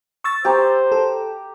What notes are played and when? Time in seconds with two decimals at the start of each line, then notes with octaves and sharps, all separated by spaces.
0.24 C#6 E6 A6
0.45 G4 C5 A#5
0.92 A4